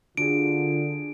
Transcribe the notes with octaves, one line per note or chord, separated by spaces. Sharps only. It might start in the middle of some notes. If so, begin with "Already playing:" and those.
D3 D4 F4 F#4 G#4 D7